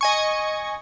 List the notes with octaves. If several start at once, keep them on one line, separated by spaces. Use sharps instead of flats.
D#5 G#5 C#6